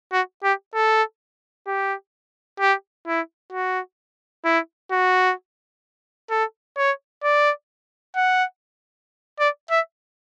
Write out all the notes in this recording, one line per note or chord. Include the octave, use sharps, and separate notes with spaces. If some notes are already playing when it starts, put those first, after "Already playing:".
F#4
G4
A4
G4
G4
E4
F#4
E4
F#4
A4
C#5
D5
F#5
D5
E5